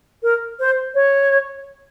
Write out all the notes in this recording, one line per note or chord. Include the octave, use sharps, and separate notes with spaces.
A#4
C5
C#5